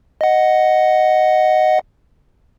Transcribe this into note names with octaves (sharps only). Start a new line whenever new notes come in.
D#5 F#5